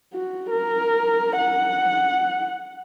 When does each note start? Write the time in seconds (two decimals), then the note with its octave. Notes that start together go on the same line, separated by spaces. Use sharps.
0.14 F#4
0.51 A#4
1.38 F#5